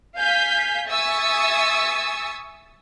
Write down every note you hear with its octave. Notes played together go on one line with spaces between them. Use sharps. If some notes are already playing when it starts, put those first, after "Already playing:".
F5 G#5 G6 B6
E5 G#5 C#6 D#6 E6 A6